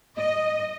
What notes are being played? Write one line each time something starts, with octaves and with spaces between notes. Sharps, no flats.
D#5